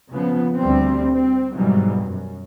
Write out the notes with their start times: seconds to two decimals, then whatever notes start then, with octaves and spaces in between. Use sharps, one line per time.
0.11 C#3 F3 B3
0.57 D2 G3 C4
1.12 C4
1.54 G#2 B2 D#3 E3 F#3 G3
1.98 F#2